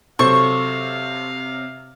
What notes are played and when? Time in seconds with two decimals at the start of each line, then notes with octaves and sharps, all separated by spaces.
0.19 C3 F#3 A4 C5 F5 C#6